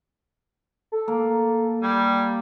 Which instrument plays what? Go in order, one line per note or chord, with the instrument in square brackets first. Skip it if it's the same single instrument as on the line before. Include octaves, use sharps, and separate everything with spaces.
[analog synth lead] A4
[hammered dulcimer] A#3
[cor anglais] G3 [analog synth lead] G#6